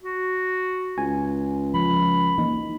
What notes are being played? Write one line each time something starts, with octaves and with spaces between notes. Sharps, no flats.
F#4
C#2 G#5
F3 B5
E3 A#3 D#4